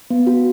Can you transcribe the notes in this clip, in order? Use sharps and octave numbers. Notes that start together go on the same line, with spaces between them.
B3
F#4